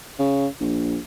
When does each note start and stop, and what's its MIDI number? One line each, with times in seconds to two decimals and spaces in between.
0.19 0.47 49
0.60 0.97 34